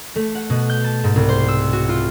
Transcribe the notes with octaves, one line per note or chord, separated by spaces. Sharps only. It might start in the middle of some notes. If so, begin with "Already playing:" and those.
A3
F#5
B2
G6
A5
G#2
C2
C5
E6
F#4
F4